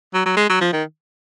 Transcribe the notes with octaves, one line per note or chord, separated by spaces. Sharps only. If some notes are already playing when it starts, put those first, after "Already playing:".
F#3
F#3
G#3
F#3
F3
D#3